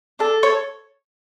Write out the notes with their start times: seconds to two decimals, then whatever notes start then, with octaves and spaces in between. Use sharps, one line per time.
0.19 D4 A4
0.43 C#5